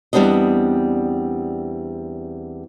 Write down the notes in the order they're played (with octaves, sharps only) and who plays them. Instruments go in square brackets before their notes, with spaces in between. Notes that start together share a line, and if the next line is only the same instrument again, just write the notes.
[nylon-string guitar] E2 G3 B3 C4 D4 D#5